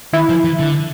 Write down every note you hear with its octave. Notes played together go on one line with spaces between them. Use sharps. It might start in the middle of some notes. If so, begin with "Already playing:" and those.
D#3 E4
F3
E3
D3